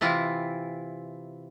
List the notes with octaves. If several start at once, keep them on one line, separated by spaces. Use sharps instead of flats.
C3 E3 E4 F4